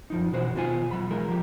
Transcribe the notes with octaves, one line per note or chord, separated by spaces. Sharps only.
F#2 F3 D#4
B2 E3 F#4 C5
D#2 B2 F3 F4 G#5
B1 F#3 B5
E3 G#3 A#4
F3 G4